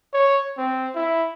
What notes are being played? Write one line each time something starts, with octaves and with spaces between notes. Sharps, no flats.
C#5
C4
E4